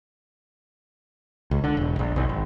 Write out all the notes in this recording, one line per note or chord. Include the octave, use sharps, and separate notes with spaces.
C#2
D3
E1
A#1
B1
G#1